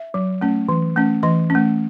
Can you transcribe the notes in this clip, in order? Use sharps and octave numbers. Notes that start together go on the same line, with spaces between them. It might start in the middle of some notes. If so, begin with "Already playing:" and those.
Already playing: E5
F#3
A3 C#4
E3
A3 C#4
E3 D#5
C#4
A3